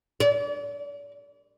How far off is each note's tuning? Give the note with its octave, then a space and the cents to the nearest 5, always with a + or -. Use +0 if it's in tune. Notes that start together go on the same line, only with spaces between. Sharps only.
D5 -40